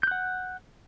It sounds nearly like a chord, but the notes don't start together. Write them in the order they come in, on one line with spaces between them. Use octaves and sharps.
G6 F#6 F#5